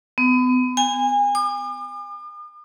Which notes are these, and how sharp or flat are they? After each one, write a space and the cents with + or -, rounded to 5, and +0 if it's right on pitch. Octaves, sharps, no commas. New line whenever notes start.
B3 +35
G#5 -30
D6 +45